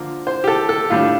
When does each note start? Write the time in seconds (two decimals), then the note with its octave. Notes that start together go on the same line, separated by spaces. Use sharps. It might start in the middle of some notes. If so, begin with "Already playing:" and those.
Already playing: D3 F3 A#3
0.27 C5
0.44 G4
0.47 A4
0.69 A4
0.90 A2 G3 D4 F4